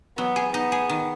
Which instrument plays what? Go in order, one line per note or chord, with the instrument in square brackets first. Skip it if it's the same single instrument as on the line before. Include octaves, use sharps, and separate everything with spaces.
[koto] F#3 [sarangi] B3
[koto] G#4
[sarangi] B3 [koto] D#4
[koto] G#4
D#3